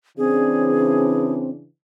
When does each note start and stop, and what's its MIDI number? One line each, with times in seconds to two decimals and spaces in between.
0.18 1.66 49
0.18 1.66 52
0.18 1.50 60
0.18 1.66 62
0.18 1.33 68